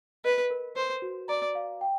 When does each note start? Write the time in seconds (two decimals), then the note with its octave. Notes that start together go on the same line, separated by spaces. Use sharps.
0.25 B4 D#5
0.50 A#4
0.76 B4 C5
1.02 F#4
1.28 D5 A#5
1.55 F5
1.81 G5